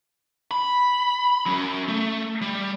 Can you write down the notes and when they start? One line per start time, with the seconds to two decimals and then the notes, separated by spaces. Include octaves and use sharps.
0.51 B5
1.46 F#3 C#4
1.88 A3
2.41 G3